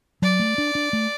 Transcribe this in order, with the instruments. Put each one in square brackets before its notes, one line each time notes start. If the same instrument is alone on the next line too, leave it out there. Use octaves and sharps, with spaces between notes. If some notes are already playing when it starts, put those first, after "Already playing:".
[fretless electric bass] F#3 [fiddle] D5
[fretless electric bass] A3
D4
D4
A3